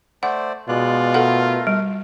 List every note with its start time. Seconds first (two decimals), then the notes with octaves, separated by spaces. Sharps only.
0.23 A3 C5 D5 F#5
0.69 B2 G#3 F4 D5 F#6
1.14 A3 A4 A#4 F#5
1.67 G3